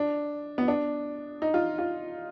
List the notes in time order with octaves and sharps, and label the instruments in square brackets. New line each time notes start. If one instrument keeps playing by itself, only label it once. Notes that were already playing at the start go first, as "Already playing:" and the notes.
Already playing: [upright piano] D4
B3
D4
D#4
F4
F4